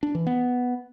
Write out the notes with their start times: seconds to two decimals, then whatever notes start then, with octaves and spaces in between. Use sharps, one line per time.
0.03 D4
0.15 E3
0.27 B3